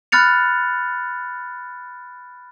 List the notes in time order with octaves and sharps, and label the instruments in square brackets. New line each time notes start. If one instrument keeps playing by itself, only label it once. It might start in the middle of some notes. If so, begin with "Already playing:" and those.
[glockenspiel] B5 F6 F#6 A6 C#7 F7